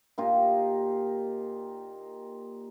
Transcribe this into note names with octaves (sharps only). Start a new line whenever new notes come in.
A#2 D#4 F4 G4